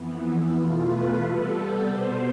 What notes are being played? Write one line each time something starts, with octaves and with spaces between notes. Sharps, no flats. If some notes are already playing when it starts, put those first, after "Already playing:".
Already playing: F2 E3 B3
E4
E2 B2 A3 F4
B4
C3 G3 B3 A4
B2 G3 B3 C5